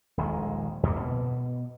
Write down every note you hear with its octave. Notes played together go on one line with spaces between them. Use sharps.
D#1 A#1 D#3 G#3
E2 G#2 C3 A#3
B2